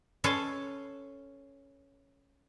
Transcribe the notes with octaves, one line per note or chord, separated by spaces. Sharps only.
C#4 A4 B4 C#5 A5 C6